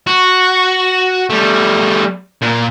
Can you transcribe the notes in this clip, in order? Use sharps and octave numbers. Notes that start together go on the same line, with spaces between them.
F#4
G3 A3
A#2